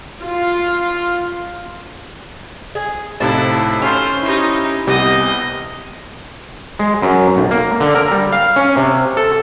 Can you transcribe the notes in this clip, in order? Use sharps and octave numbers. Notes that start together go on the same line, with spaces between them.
F4
G#4
A2 C3 F3 D#4 E4 A5
C#4 F4 C5
D#4 E4 G4
C2 C3 B3 G4 D#5
G#3
F#2
B1
A#3
D3
A#4
G3
F5
C#4
C3
A4